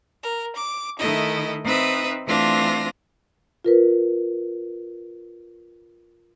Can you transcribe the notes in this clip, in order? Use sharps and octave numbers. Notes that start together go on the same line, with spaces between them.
A#4
D6
D#3 A3 E4 D#5
C4 D#4 B4 E5 D#6
E3 A3 C4 D4 F4 A#6
F4 A#4 B4